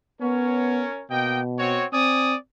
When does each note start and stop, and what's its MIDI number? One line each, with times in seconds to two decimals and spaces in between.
0.21 0.85 59
0.21 1.05 61
0.21 1.05 70
0.21 1.05 73
1.11 1.81 47
1.11 1.41 58
1.11 1.41 75
1.11 1.41 79
1.59 1.86 60
1.59 1.86 66
1.59 1.86 73
1.93 2.35 60
1.93 2.36 74
1.93 2.36 80
1.93 2.36 87